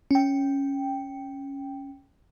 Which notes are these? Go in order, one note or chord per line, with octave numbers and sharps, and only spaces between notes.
C#4 G5